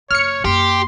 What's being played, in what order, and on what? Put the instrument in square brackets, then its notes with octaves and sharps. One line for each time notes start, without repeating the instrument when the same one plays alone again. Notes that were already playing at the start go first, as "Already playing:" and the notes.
[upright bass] F#1 [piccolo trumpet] C#5 [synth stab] F6 C#7
[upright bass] F#2 A#3 [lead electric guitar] G4 [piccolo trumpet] C6